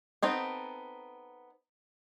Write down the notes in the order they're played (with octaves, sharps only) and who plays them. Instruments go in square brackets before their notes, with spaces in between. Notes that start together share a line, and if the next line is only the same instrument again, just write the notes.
[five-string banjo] B3 C4 D#4 A4